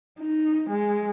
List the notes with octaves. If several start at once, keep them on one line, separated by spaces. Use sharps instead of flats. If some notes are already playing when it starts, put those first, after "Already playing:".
D#4
G#3